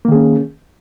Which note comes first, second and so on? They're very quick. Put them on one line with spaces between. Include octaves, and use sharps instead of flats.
A#3 D#3 G#4 C#4